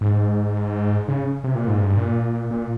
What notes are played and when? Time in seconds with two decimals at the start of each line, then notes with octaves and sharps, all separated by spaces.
0.01 G#2
1.08 C#3
1.44 C3
1.55 A#2
1.67 G#2
1.79 G2
1.97 A#2
2.51 A#2